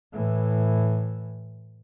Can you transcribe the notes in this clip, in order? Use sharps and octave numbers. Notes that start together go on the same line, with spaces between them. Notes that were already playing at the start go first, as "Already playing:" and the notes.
A2 E3